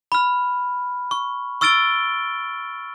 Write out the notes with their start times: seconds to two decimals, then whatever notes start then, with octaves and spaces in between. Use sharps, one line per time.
0.12 B5 F6
1.11 C#6
1.61 C#6 E6 F6 A6 D7 G7